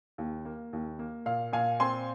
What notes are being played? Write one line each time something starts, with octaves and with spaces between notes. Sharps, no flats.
D#2
A#3
D#2
A#3
A#2 F5
A#2 F5 G#5
C4 G#5 C6